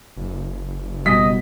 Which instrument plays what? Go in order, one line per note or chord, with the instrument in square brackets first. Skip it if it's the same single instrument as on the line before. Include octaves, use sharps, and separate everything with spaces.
[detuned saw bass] F#1
[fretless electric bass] B2 G3 [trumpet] D#5 [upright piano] B6